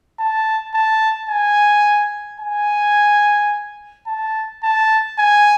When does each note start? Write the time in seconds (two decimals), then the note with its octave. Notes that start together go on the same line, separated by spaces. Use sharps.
0.19 A5
0.74 A5
1.30 G#5
2.41 G#5
4.07 A5
4.63 A5
5.18 G#5